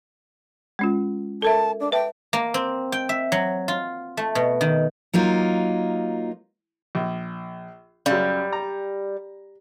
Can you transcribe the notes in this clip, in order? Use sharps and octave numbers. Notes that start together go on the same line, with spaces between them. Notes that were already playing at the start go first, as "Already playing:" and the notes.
G#3 C#4 F4
A4 A#4 E5 A5
D4
B4 E5 G5 A5
A#3
C4
G5
E5
F#3
F4
A3
B2
D#3
F#3 A#3 D#4 F4
A#1
F#2 C#3 G3
A#5